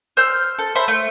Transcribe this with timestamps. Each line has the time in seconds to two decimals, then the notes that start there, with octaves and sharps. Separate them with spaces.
0.17 C5 E6 F6 G6
0.59 A4
0.75 C5 E5 B5
0.88 A3